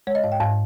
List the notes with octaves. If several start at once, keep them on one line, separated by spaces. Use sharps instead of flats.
G#3 C#5
D#5
G#2 F5
G5
G#2 F5